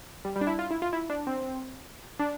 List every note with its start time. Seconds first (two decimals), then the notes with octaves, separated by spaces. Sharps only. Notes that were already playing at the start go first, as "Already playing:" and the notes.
0.25 G3
0.36 G3
0.41 D4
0.47 E4
0.59 F4
0.71 E4
0.82 F4
0.93 E4
1.10 D4
1.27 C4
2.19 D4